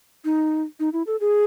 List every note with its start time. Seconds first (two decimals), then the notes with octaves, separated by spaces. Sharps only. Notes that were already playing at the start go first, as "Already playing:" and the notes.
0.25 D#4
0.80 D#4
0.93 E4
1.07 A4
1.20 G#4